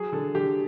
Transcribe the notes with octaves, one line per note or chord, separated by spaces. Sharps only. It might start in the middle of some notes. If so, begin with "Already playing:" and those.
Already playing: F#3 G#4
D3 A4
D3 G4